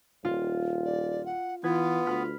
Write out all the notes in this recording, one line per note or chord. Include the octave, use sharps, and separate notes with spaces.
D#1 F4
D5
F#5
E3 B3 F4 B4 G#6
D2 B5 F6 B6